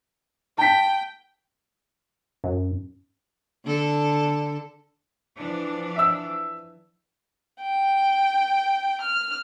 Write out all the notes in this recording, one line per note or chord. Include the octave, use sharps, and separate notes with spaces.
G5 A5 B6
F#2
D3 A4
E3 F3 D4
E5 E6
G5
F6